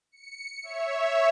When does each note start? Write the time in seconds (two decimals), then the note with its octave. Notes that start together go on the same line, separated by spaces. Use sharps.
0.12 C#7
0.63 C#5 E5